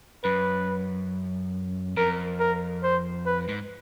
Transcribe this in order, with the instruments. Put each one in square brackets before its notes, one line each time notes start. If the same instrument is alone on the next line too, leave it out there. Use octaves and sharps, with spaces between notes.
[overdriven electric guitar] F#2 [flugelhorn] B4
[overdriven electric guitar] F2 [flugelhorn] A#4
[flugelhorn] A#4
C5
B4
[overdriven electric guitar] G#2